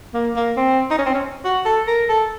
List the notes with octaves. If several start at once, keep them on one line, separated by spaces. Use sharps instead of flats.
A#3
A#3
C4
D#4
C#4
C4
C#4
F#4
A4
A#4
A4